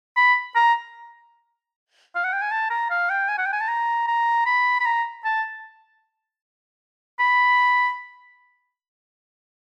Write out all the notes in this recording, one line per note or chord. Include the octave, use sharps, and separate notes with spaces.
B5
A#5
F5
F#5
G5
G#5
A5
A#5
F5
G5
G#5
F#5
G5
G#5
A5
A#5
A#5
B5
B5
A#5
A5
B5